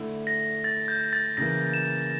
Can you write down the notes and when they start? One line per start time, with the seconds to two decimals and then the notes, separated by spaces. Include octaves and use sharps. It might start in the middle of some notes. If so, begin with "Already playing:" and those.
Already playing: D3 A3 E4
0.27 A#6
0.64 A6
0.88 G6
1.13 A6
1.37 C#3 E3 A#3 A#6
1.74 E7